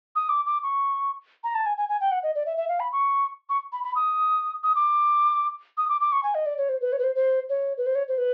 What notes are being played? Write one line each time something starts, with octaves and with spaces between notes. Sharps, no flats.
D#6
D6
D6
C#6
A#5
A5
G#5
G#5
G#5
G5
F#5
D#5
D5
E5
E5
F5
B5
C#6
C#6
B5
B5
D#6
D#6
D6
D#6
D6
D6
C#6
G#5
D#5
D5
C#5
C5
B4
C#5
B4
C5
C5
C#5
B4
C5
C#5
C5
B4